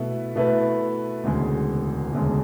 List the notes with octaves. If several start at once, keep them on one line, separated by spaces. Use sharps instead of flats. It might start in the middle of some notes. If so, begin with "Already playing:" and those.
Already playing: B2 A3 E4 B4
B2 A3 E4 B4
E1 D2 C#3 G#3
E1 D2 C#3 G#3